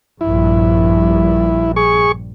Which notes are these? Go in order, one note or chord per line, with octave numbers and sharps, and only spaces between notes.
A#1 G2 E4
G#4 C#6